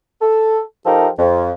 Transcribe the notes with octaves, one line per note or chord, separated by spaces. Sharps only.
A4
F3 D#4 F4 G4 A4 A#4
F2